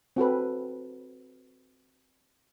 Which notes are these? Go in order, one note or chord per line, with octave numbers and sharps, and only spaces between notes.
C4 F#4 A4 B4